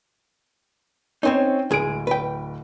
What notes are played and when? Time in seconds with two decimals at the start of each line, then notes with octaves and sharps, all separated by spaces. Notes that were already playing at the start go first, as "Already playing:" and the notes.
1.23 C4 C#4 D#4 C5 C#5
1.71 D1 G#3 G#4 D7
2.07 B4 G5